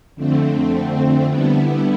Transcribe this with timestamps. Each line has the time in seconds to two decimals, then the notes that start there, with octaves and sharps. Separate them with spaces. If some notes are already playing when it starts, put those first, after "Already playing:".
0.15 F2 D3 A3 C4
1.24 D3 G3 B3 E4